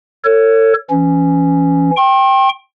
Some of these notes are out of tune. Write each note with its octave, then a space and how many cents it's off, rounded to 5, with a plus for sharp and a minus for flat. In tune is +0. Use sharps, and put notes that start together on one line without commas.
A4 +35 C#5 +0
E3 +25 C#4 +0
G5 +0 C6 +45